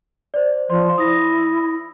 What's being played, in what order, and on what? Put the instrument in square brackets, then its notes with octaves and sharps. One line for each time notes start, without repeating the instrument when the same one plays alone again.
[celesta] C5 D5
[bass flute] F3 [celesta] C5 D5 C6
[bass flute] E4 [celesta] D#6 A#6